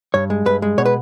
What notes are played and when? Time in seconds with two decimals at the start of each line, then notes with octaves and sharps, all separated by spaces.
0.14 G2 C#5
0.30 G#3
0.46 G2 B4
0.62 G#3
0.78 B2 C#5
0.85 B4